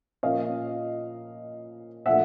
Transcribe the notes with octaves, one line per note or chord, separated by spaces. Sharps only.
A#2 F3 A#3 C#4 D#5 F5
A#2 F3 A3 D4 E5 F#5